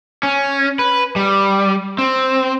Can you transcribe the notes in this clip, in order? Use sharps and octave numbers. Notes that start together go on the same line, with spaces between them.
C#4
B4
G3
C4